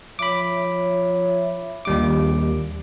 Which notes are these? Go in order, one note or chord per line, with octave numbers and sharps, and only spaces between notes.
F3 C#5 E5 B5 D6
A#1 D#2 G3 D6